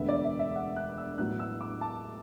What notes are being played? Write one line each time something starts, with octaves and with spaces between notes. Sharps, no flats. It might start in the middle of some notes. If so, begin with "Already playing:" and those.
Already playing: E1 D2 D3 B3 E5
D5
E5
E5
F#5
F#6
E6
A1 A2 F#3 B3 F#6
E6
D6
A5